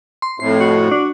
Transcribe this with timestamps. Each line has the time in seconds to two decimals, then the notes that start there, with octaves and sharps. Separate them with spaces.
0.22 C6
0.40 F2 A2 C7
0.60 F#4
0.91 D4